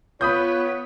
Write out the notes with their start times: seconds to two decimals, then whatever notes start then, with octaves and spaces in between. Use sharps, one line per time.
0.21 B3 F4 B4 C#5 B5 D#6 G6